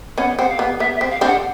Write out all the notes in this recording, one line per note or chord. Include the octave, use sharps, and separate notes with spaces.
B3 C#4 F#5
C4 F#5
F5
B3
B3 E5
E5
C4
F5
C4 D4
F#5